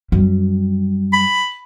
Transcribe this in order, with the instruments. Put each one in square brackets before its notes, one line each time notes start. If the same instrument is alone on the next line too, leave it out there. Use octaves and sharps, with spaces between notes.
[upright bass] F#2 G3
[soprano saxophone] B5